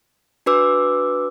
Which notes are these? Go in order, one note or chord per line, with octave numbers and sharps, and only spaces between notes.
D4 F#4 B4 D6 E6